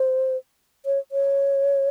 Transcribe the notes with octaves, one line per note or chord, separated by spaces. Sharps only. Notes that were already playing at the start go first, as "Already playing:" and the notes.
Already playing: C5
C#5
C#5